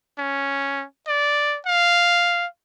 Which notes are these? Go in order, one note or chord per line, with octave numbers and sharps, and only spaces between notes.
C#4
D5
F5